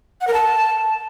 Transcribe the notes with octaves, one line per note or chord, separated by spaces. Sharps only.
F#5
A#4
A5